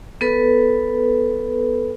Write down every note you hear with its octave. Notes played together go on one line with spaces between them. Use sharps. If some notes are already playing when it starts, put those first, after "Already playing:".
B3 A4 B4